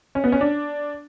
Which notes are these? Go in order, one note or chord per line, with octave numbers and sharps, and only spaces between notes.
C#4
B3
C#4
D4